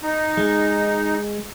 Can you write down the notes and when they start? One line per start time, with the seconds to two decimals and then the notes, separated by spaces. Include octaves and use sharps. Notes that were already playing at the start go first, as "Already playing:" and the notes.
0.02 D#4
0.37 G#3